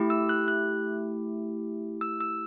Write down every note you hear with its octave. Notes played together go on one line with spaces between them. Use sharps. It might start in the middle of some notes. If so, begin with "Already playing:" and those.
Already playing: A3 E4 G4
E6
F#6
F#6
E6
E6